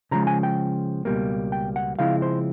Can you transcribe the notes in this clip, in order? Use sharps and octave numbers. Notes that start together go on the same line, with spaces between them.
C#3 F3 G#3 A#5
G#5
G5
C#2 B2 G3 A#3
G5
F#5
C#3 F3 G#3 C4 E4 F5
C5